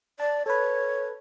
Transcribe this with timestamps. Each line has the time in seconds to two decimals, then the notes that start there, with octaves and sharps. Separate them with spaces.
0.20 D5 A5
0.46 A4 B4 C#5